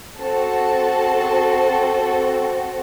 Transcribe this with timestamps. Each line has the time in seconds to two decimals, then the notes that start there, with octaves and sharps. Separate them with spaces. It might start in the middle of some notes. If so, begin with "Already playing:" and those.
0.19 C4 F#4 A4 A5